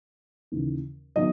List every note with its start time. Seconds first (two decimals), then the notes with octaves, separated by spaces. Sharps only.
0.52 D#2 C#3 E3
1.16 D#3 F#3 B3 D#5